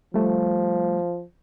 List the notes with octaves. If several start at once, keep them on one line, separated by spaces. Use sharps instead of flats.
F3 G3 A3